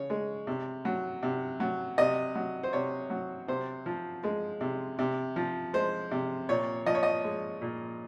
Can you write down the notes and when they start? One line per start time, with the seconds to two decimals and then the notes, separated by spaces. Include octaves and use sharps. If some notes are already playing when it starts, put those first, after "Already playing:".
Already playing: C#3 C#5
0.10 G#3
0.47 C3
0.85 F#3
1.23 C3
1.60 F#3
1.98 C3 D#5
2.35 F#3
2.63 C5
2.73 C3 C#5
3.10 F#3
3.48 C3 C5
3.86 F3
4.24 G#3
4.61 C3
4.99 C3
5.36 F3
5.74 G#3 C5
6.11 C3
6.49 A#2 C#5
6.86 F3 D#5
6.95 C#5
7.03 D#5
7.24 G#3
7.62 A#2